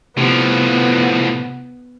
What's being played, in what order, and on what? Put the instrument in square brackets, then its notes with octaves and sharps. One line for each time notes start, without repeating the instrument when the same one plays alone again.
[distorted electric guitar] A2 F3 [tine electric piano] C3 [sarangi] B3